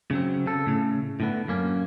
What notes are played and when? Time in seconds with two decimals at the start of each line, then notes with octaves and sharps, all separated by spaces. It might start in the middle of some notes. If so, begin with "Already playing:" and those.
0.11 C#3 F#3 C4
0.46 C#3 A4
0.66 A2 C#3
1.20 A2 D3 B3
1.48 F#2 A#3 C#4